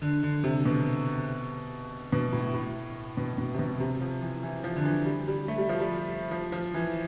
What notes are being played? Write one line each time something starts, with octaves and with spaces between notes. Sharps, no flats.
D3
D3
C3
B2
B2
A2
A2
B2
B2
C3
B2
C3
F3
E3
E3
F3
D3
E3
G3
G3
A3
G3
F3
G3
F3
F3
E3